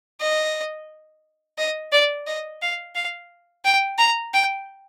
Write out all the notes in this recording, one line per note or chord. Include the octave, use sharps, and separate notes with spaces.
D#5
D#5
D5
D#5
F5
F5
G5
A#5
G5